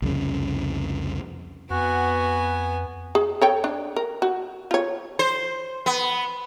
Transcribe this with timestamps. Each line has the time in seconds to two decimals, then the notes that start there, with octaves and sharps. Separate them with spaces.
0.02 C2 F2 C#3
1.70 F2 B3 F#4 G#5
3.15 G#4
3.42 A4 C#5 G5
3.64 D4
3.96 A#4
4.22 F#4
4.71 F4 C#5
5.19 C5
5.86 B3